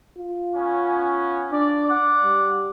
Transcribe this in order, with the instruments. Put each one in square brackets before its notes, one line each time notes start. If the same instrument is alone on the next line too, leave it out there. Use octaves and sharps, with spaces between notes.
[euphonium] F4
[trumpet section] B3 C#4
[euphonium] D4 [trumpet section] D5
[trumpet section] D5 F#5 D6
[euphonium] G3